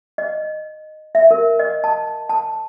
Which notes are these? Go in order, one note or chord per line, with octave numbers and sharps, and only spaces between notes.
D#5
E5
A#4
D#5
A5
A5